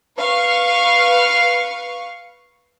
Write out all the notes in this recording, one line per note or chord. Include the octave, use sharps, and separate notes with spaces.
B4 F5 C#6